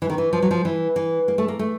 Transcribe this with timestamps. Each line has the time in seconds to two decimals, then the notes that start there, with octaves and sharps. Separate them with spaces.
0.02 E3
0.10 D#3
0.18 E3
0.33 F3
0.42 F#3
0.51 F3
0.65 E3
0.96 E3
1.28 A#3
1.38 A3
1.48 A#3
1.59 A3